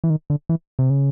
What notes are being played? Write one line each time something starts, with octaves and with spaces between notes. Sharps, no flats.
E3
D#3
D3
E3
C3
C#3